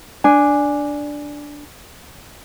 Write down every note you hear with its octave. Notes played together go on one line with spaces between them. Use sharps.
D4 G#5